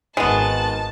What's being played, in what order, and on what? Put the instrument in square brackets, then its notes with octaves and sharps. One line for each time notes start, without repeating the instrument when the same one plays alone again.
[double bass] G#1 D#3 [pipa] G#3 B3 [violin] A5